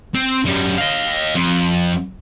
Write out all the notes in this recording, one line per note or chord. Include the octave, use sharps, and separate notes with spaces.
C4
F#2 G3
D#5 F5
F2